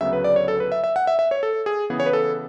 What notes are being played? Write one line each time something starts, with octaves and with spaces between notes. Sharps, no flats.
D2 C#3 F#3 B3 E5
B4
D5
C#5
A4
B4
E5
E5
F#5
E5
E5
C#5
A4
G#4
C#3 E3 B3 G#4
C#5
B4
A4